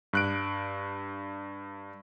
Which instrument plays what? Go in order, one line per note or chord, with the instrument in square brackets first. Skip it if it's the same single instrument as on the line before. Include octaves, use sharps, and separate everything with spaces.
[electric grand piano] G2 F#6 D7